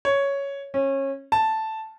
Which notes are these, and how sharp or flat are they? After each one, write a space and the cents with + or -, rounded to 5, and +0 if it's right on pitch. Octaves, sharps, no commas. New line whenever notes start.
C#5 +5
C#4 -25
A5 +0